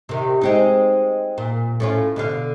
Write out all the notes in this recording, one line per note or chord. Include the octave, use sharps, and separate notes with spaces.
C3 D#3
G#3 C4 D#4
A#2
A2 C#4 F4
B2 D3 F5